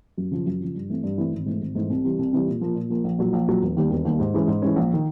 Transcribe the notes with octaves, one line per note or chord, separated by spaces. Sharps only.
F#2
C#3 F3
F#2
C#3 F3
G2
E3 A3 C4
G2
E3 A3 C4
G#1
G#2 E3 A3
G#1
G#2 E3 A3
C2
C3 E3 G3
C2
C3 E3 G3
A#2
F3 A#3
A#2
F3 A#3
A#1
A#2 F#3
A#1
A#2 F#3
E1
D#2 D#3 G3
E1
D#2 D#3 G3
G#2
E3 G#3 C#4
G#2
E3 G#3 C#4
A#1
D#3